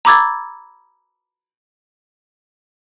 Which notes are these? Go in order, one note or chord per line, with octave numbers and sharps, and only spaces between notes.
A#5 B5 D6 E6 G#6 A6